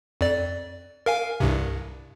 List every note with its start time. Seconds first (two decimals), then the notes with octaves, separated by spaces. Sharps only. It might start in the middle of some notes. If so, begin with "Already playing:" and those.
0.21 F2 D5
1.06 A#4 F5 G#5
1.40 C2 G2 C3